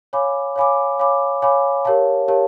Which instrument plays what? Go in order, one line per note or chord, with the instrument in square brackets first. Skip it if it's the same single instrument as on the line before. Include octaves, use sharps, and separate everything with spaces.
[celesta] C#5 F5 G#5 B5 D6
C#5 F5 G#5 B5 D6
C#5 F5 G#5 B5 D6
C#5 F5 G#5 B5 D6
G4 A#4 C#5 F5 A5
G4 A#4 C#5 F5 A5